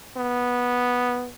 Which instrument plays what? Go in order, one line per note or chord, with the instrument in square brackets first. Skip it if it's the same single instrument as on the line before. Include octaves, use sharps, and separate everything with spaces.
[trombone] B3